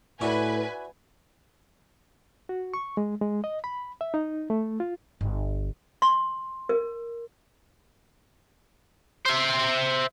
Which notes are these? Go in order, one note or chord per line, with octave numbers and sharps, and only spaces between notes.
A2 E4 F#4 B4 D5 G#5
F#4
C#6
G#3
G#3
D#5
B5
E5
D#4
A3
F4
G1
C6
A#4
C5 E5